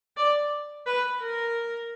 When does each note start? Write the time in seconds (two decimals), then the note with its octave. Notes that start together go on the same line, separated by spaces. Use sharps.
0.17 D5
0.87 B4
1.22 A#4